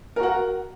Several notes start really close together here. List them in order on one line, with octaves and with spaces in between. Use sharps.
A#4 F#4 F#5